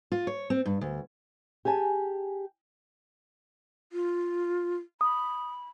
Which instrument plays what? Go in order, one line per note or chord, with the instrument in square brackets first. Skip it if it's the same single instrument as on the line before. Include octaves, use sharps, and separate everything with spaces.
[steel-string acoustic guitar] F4
C#5
C4
G2
D2
[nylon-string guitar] G4 G#4 G#5 A5
[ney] F4
[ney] B5 [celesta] D#6